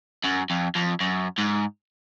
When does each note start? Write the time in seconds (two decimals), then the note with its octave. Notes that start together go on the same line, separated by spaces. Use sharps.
0.24 F#2
0.50 F2
0.75 F2
1.00 F#2
1.38 G#2